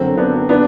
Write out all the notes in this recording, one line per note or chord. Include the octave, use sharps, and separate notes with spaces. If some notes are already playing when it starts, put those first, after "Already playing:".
Already playing: F#2 D3 F#3 C4
B3 D4
B3 D4